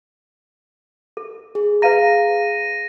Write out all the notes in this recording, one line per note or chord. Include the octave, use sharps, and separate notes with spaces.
A4
G#4
B4 F5 A#5 A#6 D#7